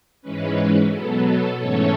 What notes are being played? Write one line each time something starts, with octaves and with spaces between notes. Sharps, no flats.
G#2 E3 G#3 C#4 B4
B2 F#3 B3 A4
A4
G#2 E3 A3 C#4 A4 C#5